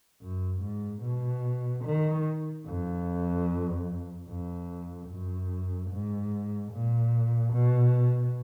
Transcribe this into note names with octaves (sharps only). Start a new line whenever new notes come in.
F#2
G#2
B2
D#3
F2
F2
F#2
G#2
A#2
B2